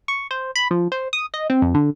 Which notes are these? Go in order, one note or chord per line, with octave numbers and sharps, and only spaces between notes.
C#6
C5
B5
F3
C5
D#6
D#5
C4
F2
D3